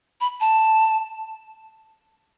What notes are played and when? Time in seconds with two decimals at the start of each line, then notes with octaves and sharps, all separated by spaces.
0.21 B5
0.41 A5